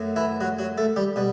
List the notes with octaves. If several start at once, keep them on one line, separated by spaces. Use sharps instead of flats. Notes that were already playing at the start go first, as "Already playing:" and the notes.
Already playing: F#2 F#3 A3
E3 E4
F#3 F#4
F#3 F#4
A3 A4
G3 G4
B2 G3